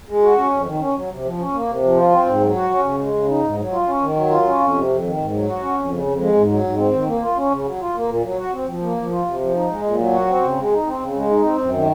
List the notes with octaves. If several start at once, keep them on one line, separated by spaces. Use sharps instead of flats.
G#3
F#4
C#4
F2
D#3
C#4
F#3
C3
F3
C#4
A#3
C3
F3
F4
C4
G#2
F#3
F#4
C#4
C#3
G#3
C#3
D#4
G#2
F#3
F4
C#4
D#3
F#3
F4
C#4
F2
C3
F2
D#3
G#2
F#3
F#4
C#4
F2
C#3
F2
G#3
G#2
F#3
G#2
C4
D#3
A#3
F4
C#4
C#3
F#3
F4
A#3
A#2
F#3
F#4
C4
F3
A#3
F3
F4
C3
F3
D#4
G#3
A#2
F#3
F#4
C4
C#3
G#3
D#4
C4
C#3
G#3
D#4
C4
F#2
D#3